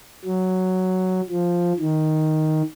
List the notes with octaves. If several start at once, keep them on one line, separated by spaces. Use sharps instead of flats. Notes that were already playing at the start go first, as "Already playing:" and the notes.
F#3
F3
D#3